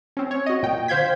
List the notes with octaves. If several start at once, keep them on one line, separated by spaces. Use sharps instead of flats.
C4 C#4
C#5
F#4 D#5
A#2 G5
D3 C5 F5 G6 G#6 B6